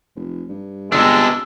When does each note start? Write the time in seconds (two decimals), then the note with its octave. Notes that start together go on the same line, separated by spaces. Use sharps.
0.16 F1
0.49 G2
0.92 G1 C3 G#3 D4 E6